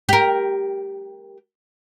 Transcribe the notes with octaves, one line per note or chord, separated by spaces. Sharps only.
G4 A#4